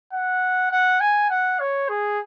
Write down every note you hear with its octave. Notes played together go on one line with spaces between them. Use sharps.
F#5
F#5
G#5
F#5
C#5
G#4